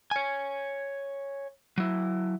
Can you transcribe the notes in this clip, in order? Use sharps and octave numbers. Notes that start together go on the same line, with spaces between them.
C#5 G#5
F#3 E4